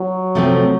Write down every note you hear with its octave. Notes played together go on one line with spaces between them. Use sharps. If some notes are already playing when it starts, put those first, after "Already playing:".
Already playing: F#3
C3 F3 A3 C4